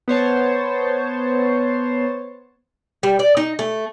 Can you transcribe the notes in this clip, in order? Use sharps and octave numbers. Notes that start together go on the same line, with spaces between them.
B3 C5 C#5 A5
G3
D5
D#4
A3